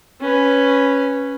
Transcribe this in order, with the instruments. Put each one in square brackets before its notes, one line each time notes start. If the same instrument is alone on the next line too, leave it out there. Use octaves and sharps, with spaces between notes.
[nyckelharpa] C#4 B4